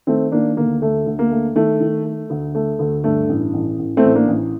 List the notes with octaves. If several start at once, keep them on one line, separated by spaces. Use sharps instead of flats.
D#3 A3 C4
D#3 A#3 D4
D2 A#3
D2 A3
D2
A#3
A3
D#3 A3
D#3
A3
D2
A3
D2
G2 A3
A1
A1
A1
A3 C4
A1
A#3 D4
A1